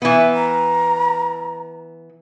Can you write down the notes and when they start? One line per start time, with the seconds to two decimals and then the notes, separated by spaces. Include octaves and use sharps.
0.02 E3 B3 E5
0.34 A#5